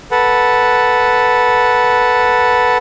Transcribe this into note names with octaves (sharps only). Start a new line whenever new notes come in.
A4 B4 F#5